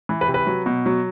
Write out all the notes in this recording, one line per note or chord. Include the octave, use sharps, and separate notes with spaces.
E3
B4
C3
B4
F#3
B2
F#3